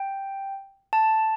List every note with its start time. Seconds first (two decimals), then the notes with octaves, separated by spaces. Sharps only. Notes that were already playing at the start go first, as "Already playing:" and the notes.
Already playing: G5
0.93 A5